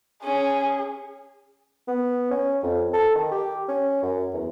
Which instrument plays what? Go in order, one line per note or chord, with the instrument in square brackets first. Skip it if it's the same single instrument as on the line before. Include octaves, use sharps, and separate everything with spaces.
[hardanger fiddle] C#4 [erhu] G#4
[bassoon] B3
C#4
F2
A4
D#3
G4
C#4
F#2
E2